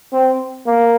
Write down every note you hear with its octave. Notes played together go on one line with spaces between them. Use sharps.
C4
A#3